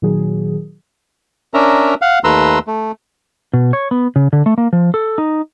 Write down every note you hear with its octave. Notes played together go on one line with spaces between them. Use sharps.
A#2 D#3 F#3 G#4
C#4 D4 A#4 E5 A#5
F5 F#5
D#2 A3 B4 A#5 C6 E6
A3
B2
C#5
B3
C#3
D3
A3
A#3
F3
A4
D#4